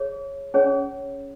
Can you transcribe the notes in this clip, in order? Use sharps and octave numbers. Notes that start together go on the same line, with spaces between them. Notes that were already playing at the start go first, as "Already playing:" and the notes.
Already playing: G#4 C#5
C#4 G#4 C#5